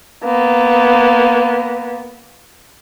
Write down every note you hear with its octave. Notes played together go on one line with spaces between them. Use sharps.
A#3 B3